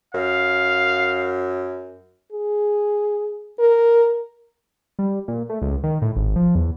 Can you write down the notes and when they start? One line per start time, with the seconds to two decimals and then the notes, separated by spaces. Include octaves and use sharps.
0.14 F#2 F5
2.33 G#4
3.59 A#4
4.99 G3
5.28 A#2
5.49 A3
5.62 C#2
5.83 D#3
6.02 A2
6.16 G#1
6.36 F3
6.55 E2